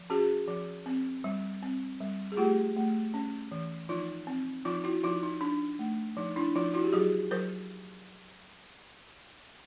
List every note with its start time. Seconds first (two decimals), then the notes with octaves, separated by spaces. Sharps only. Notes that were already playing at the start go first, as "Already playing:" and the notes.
Already playing: F3
0.10 C#4 F#4 G#4
0.48 F3
0.86 C4
1.24 G3
1.63 C4
2.00 G3
2.32 G#4
2.37 A3 F4 G4
2.76 A3
3.14 C#4
3.52 E3
3.89 F3 D#4 F4
4.27 C4
4.65 F3 D#4 F4
4.84 E4 F#4
5.04 F3 D#4 F4
5.23 D#4
5.41 D4
5.79 A3
6.17 F3 D#4
6.36 D4 E4
6.55 F3 D#4 F4
6.74 E4 F#4
6.84 G4
6.93 F#3 F#4 G#4
7.31 F#3 A#4 C5